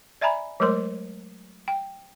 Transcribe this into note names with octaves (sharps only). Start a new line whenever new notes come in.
D5 E5 G#5 A#5 B5
F#3 G#3 A3 A#4 C5 C6
G5